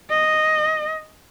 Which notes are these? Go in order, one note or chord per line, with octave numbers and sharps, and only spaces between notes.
D#5